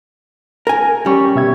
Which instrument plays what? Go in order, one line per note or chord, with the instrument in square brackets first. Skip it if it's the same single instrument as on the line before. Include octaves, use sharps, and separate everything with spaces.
[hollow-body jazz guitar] A#4 G#5
[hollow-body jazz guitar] G3 [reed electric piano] C#4 G4 C#6
[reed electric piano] B2 E5 G#6